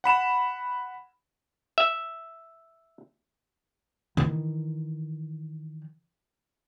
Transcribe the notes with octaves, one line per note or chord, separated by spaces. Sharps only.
F#5 B5 E7
E5
D#3 E3